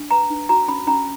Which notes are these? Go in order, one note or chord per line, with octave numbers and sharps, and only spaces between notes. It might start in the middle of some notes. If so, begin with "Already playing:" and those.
Already playing: D4
B4 A#5
D4
F#4 A#5
C#4 B5
C#4 A#5